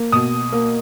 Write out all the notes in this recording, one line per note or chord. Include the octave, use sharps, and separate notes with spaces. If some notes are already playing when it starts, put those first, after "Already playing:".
Already playing: A#3
B2 D#6
A#3